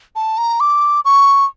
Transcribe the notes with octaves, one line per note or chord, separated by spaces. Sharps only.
A5
A#5
D6
C#6